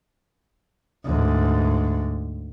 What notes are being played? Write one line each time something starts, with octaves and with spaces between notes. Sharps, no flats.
D2 G#2